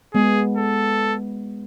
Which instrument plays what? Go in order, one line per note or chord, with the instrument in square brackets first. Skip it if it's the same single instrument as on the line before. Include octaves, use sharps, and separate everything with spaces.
[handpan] G#3 B3 [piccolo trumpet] G#4
[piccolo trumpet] A4